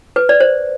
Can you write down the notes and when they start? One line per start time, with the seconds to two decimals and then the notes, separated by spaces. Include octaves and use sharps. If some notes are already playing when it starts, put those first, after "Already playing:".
0.16 B4
0.29 D5
0.40 C5